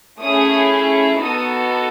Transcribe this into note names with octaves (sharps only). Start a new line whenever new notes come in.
A3 C#4 E4 G#4 D#6
B3 D#4 F#4 A4 D#6